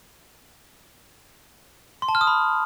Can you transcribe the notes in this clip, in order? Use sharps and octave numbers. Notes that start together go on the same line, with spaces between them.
C6
A5
F6
D#6
B5